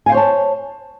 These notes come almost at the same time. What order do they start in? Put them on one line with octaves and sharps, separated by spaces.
G#5 F5 C5 C#5 A5